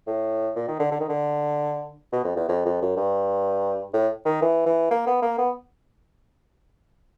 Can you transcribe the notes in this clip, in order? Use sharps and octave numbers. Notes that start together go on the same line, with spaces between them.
A2
A#2
D#3
D3
D3
D#3
D3
B2
F2
E2
F2
F2
F#2
G2
A2
D#3
E3
E3
A#3
B3
A#3
B3